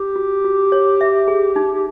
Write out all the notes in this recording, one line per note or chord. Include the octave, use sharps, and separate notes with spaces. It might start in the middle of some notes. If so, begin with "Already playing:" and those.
Already playing: G4
F#4
F#4
C#5
E5
G#4
D#4
G4